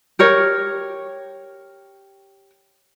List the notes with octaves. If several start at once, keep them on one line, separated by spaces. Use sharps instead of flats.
G4 A#4 C#5